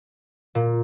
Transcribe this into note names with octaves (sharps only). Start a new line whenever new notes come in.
A#2